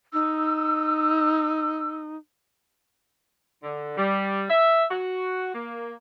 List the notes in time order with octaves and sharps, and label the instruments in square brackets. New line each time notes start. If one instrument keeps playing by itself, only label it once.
[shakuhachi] D#4 [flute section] E6
[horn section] D3
G3
E5
F#4
A#3